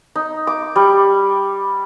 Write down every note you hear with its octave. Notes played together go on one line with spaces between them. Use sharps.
D#4
D6
G3